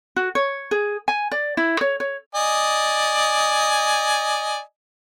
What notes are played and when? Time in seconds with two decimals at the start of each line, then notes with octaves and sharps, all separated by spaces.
0.16 F#4
0.35 C#5
0.71 G#4
1.08 G#5
1.31 D5
1.57 E4
1.81 C#5
2.00 C#5
2.35 D5 D#5 G#5